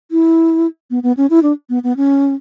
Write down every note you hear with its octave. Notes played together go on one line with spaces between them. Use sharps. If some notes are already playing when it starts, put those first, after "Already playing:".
E4
B3
B3
C#4
E4
D4
B3
B3
C#4